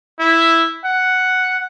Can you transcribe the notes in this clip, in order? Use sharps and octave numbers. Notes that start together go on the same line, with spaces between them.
E4
F#5